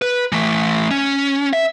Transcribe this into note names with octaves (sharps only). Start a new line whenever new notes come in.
B4
E3 A3
C#4
E5